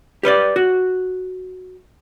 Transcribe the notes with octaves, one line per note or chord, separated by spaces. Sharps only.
G4 B4 C#5 D5
F#4